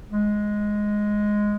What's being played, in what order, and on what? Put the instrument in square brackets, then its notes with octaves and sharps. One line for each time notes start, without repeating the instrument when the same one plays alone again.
[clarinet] G#3